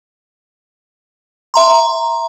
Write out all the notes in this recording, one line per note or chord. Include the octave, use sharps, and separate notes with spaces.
E5 A#5 C6